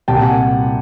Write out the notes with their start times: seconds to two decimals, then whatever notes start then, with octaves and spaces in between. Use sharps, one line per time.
0.08 C2 A#2 G3 G5 A5
0.22 F#5 G#5